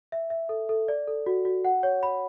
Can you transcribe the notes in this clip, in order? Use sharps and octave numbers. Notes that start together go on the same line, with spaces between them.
E5
E5
A4
A4
D5
A4
F#4
F#4
F#5
C#5
B5